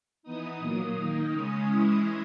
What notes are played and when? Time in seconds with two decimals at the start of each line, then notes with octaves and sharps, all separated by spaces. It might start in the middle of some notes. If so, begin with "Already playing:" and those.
0.23 E3 B3 D#4 D#6
0.59 A#2 F#3 A#3
0.95 D#3 A#3 D#4 D#6
1.31 C#3 G#3 C#4
1.68 E3 G#3 C#4 E4